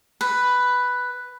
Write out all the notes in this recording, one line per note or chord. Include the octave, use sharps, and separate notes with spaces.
B4